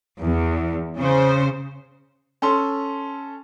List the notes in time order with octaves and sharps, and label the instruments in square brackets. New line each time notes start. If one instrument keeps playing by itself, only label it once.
[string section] E2
C#3 C5
[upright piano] C#4 A4 C6